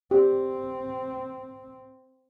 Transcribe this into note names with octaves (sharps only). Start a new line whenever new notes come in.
C4 G4